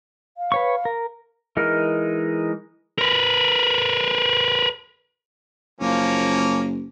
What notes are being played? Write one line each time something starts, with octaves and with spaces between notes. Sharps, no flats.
F5
B4 C#5 C#6
A#4
E3 G#3 D#4 A#4 F6
A#4 B4
F#1 F3 A#3 C#4